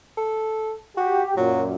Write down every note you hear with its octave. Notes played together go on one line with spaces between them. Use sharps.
A4
F#4 G4
F#2 A#2 F#3